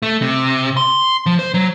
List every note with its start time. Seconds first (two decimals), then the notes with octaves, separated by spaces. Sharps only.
0.03 A3
0.22 C3
0.77 C6
1.26 F3
1.39 C5
1.54 F#3